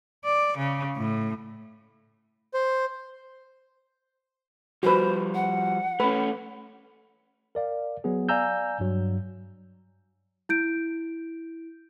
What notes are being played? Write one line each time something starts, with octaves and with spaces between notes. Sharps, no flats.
D5
C#3
A2
C5
F3 G3 F#4 B4 C5
F#5
A3 C#4 B4
A#4 D5 F5
F#3 B3 G#4
D5 F5 G#5 A#5 E6 G6
G2 F#3
E4 G6 D7